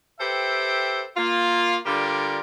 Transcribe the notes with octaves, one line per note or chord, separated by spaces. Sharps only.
G4 A4 B4 C5 E5 G5
A#3 F4
D3 G3 F4 G4 A#4 D5